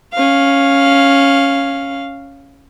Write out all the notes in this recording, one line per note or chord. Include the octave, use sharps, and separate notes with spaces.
C#4 F5